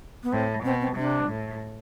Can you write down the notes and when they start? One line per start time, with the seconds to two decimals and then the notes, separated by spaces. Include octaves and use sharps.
0.23 B3
0.32 A2 C4
0.64 B2 C4
0.81 C4
0.97 C3 D4
1.29 A2